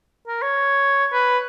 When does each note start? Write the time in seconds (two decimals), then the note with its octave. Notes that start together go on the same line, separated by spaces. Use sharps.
0.28 A#4
0.42 C#5
1.13 B4